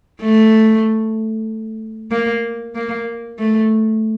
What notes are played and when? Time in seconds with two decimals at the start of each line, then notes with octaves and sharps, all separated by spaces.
0.21 A3
2.11 A#3
2.75 A#3
3.39 A3